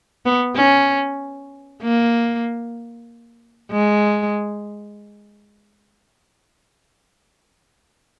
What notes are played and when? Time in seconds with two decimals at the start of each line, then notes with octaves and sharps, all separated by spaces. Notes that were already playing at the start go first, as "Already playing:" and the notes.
0.25 B3
0.56 C#4
1.82 A#3
3.71 G#3